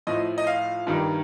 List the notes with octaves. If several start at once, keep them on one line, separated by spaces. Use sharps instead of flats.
A2 F3 D#5
D#5
F5
G2 D#3 G3